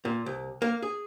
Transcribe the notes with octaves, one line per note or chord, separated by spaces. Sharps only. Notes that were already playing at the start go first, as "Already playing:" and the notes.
A#2
C2
A#3
G#4